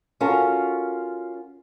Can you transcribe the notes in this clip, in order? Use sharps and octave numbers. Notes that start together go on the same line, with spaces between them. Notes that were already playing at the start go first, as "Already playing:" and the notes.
C#4 F4 F#4 A4 A#4